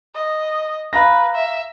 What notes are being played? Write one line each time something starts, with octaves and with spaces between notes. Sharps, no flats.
D#5
B4 F5 A#5 A#6
E5